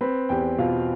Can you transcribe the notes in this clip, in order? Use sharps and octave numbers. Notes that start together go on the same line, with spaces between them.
C4 B4 B5
E2 G4 G5
B2 F4 F5